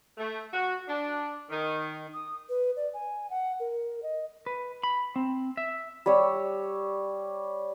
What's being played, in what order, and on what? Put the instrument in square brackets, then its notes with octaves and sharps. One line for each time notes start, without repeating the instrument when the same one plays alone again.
[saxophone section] A3
F#4
D4
D#3
[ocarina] D#6
B4
D5
G#5
F#5
A#4
D#5
[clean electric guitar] B4
B5
C4
E5
[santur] G3 C#5 E6